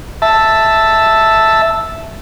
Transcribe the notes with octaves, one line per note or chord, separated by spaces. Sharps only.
E5 A5